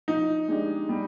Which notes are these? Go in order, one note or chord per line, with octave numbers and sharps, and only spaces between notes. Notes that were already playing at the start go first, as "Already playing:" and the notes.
F3 D#4
G#3 D4 G4
G3